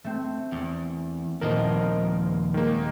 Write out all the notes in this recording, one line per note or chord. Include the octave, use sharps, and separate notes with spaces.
A3 C4
E2
D#1 D#2 F3 A#4 D#5 A5
D#3 G#3 A#3